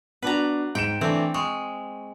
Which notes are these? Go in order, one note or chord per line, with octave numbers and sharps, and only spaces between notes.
B3 D4 F#4 B4 A#5
G#2 G5 C#7 E7
E3 A3 C4 D4
G#3 C#6